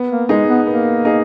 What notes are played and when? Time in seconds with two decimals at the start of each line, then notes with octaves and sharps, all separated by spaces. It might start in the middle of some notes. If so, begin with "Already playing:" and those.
Already playing: B3
0.11 A#3
0.29 G#3 D#4 G#4
0.48 B3
0.67 A#3 B3
1.05 D#4 G#4